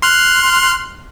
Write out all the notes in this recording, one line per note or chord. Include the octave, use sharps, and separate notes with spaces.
C6 F6 F#6